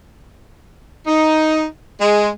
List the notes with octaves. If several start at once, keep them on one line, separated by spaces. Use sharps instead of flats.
D#4
G#3